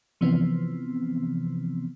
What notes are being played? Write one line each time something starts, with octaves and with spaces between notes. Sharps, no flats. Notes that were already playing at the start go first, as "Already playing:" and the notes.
C3 E3 F3 B3 C4